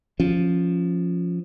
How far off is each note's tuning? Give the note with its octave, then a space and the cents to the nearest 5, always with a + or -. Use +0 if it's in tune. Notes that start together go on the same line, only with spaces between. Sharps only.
F3 +0 C#4 -5